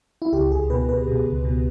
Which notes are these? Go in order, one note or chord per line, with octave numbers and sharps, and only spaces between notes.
E4
C#2 G4
C#2 G#4
B2 B4
B2 B4
B2
C#2
B2